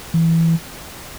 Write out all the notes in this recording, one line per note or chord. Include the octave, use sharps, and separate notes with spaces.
E3